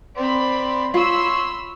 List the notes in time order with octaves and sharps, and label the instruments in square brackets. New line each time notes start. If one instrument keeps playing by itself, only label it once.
[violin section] C4 B5 [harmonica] D5 C6
[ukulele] F4 [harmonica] C#5 [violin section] B5 C6 E6